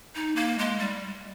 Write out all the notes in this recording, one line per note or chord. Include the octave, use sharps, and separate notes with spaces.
D#4
A#3
G#3
G3